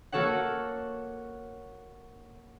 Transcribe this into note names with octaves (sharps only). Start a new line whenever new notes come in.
A#3 F#4 A4 C#5 F#5